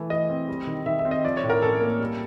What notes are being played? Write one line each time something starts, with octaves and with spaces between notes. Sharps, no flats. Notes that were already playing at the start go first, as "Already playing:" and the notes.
Already playing: E3 A3
E3 D#5
C4
G3
D#3
D#3 E5
E5
C4
D#5
F3 D5
C#5
A2
A#4
C#4 A4
A#3
G3